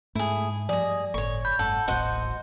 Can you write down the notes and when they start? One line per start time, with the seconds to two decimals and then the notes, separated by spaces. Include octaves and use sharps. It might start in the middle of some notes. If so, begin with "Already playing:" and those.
0.15 G#2 A3 E4 G#4
0.69 G2 F3 G#4 D5 D#5
1.14 G1 A2 C#5 C#6
1.45 B5 G6
1.59 F#1 G#2 A4 F#5
1.88 D#1 A1 A2 F#4 C5 D#5 F#5